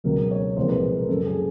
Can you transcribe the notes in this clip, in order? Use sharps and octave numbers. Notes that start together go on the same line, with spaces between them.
C#2 B2 F#3 A#4
C#5
C2 A#2 F3 G#3 C5
B4
A#4
F#2 C#3 F#3 A4
G#4